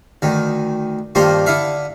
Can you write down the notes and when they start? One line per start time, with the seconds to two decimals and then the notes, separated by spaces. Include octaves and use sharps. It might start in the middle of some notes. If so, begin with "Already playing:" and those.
0.22 D2 D#3
1.15 G2 D#3 F3 A#3 C6
1.46 D3 E4 E5 F5